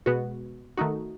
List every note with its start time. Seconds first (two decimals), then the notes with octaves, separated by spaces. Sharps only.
0.06 B2 G#3 B3 F#4
0.77 D#3 A3 D#4 F#4